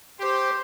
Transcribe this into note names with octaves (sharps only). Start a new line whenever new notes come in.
G4 C5